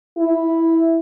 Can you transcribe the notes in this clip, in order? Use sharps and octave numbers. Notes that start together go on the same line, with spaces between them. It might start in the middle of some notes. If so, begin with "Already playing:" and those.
E4